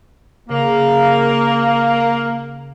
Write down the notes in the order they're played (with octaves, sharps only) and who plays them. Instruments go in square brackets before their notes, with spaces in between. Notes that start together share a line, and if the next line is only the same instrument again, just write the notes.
[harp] C#3 [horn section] A#3